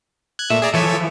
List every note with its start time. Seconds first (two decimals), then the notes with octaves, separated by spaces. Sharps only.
0.39 F#6 G#6
0.50 A#2 A3 E5
0.62 G#4 D5 A#5
0.74 E3 F3 A4 C#5 E5